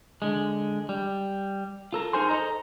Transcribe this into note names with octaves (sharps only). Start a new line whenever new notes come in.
D3 G#3
G3
F4 A4 A#4
D#4 G#4 A#4 C5 G#5 C6
A4 C5 C#5 D#5 A#5